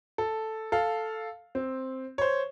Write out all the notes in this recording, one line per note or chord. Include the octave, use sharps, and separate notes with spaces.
A4
A4 F5
C4
C5 C#5